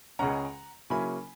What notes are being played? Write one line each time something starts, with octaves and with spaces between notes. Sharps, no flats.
C#2 C#3 G#3 C#4 F#5 A#5
C#3 F#3 A#3 C#4 E4 G#5 B5